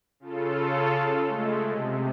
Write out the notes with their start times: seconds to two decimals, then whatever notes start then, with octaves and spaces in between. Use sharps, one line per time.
0.20 C#3 F4 A4
1.23 G#3 A3
1.67 C3